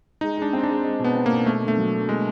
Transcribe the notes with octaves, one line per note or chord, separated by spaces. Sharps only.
G#3 D#4
G#3 D4
C4
D4
G#3
G#3
B2
B3
C4
A#3
B2
A3 A#3
D3
A3
F#3
D3
G#3 A#3